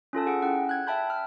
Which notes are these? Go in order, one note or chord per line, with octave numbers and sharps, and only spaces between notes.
C#4 F4 A4 A5
G#4 F#5 D7
C#4 E4 F#5 G5
F#6 G#6
E5 G5 A5 B5 G6
F6